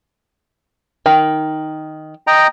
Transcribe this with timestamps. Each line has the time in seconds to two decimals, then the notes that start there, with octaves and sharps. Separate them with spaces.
1.06 D#3
2.27 D#5 G5 A#5